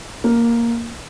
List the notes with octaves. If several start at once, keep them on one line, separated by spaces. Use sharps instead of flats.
A#3